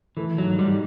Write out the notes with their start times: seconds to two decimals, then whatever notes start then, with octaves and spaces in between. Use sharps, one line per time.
0.17 E3 A3
0.38 G#2 F#3
0.59 G#2 G3